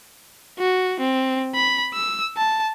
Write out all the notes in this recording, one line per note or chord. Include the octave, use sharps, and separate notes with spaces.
F#4
C4
B5
E6
A5